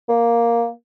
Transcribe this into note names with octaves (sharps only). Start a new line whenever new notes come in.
A#3